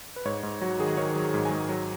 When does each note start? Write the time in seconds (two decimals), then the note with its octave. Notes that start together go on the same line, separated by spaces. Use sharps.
0.16 B4
0.25 G#2 C#5
0.43 G#2
0.61 F#3 F#4
0.79 D#3 G#4
0.97 D#3 C#5
1.15 F#3
1.34 G#2
1.45 G#5
1.51 G#2
1.69 F#3